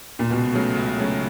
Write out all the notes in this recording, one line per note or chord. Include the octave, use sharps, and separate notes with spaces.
A#2
C#2 B2
C#3 F#3 A3
C#2
C#3 F#3 A3